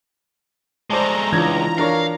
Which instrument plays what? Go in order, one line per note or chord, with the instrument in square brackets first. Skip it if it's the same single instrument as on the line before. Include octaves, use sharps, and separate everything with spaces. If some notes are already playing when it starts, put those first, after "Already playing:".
[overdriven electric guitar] G#3 A3 [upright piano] C5 D5 A5 [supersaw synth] A#5
[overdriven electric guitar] C#2 [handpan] E3 F4 [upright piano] D4 G#6
[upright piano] D4 A#4 C#5 [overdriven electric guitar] F5